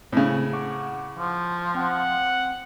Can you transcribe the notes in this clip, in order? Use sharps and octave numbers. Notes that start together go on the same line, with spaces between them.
A2 C#3 C4
F#5 C#6 D6
F3
C4 F#5 G5